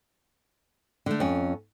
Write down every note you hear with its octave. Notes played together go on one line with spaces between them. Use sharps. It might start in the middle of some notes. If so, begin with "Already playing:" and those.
D3 A3
F2 C#4